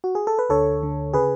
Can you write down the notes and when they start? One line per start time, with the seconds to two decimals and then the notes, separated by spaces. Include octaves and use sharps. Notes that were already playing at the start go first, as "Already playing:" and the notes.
0.04 F#4
0.15 G#4
0.27 A4
0.39 B4
0.49 D2 D3 A4 C#5
0.82 D2 D3
1.13 C#3 G#4 B4